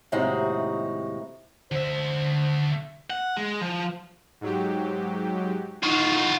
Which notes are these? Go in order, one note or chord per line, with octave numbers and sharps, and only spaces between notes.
D#2 A2 C3 G#3 D#4 F#4
D3 C5 E5
F#5
G#3
F3
G#2 F#3 G4
D#4 F4 F#4